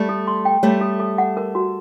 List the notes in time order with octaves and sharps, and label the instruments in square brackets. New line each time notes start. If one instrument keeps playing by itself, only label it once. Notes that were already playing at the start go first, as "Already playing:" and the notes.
Already playing: [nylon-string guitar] G3 A3 [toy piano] D5
[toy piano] A4
C6
G5
[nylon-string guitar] G3 A3 [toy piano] C#5
[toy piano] A4
A4
F#5
A#4
F#4